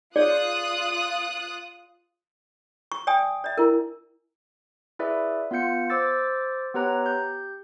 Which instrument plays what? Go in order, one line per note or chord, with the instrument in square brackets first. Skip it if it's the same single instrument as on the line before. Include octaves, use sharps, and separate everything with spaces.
[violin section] F4 D#6 F#6 [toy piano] G#4 C#5 D5
[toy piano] C#6
D5 G5 G#5 D#6
D5 E5
E4 A#4
[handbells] E4 G#4 B4 D5 E5
B3 F4 F5 G6 C#7
C5 D6 E6 A6
B3 G4 B4 C#5 A#5 F#6
G4 G6